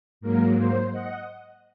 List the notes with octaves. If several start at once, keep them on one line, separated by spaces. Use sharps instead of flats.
G#2 F#3 A#3 A#4
C5
D#5 F#5